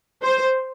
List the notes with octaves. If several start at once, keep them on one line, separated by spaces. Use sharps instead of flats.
C5